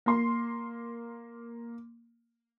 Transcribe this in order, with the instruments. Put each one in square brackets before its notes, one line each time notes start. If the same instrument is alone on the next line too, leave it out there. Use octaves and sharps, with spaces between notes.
[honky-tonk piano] A#3 C6